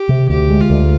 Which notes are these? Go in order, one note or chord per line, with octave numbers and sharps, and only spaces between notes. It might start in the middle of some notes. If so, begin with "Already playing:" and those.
Already playing: G4
C3
D2 G4
G#3
F4
D2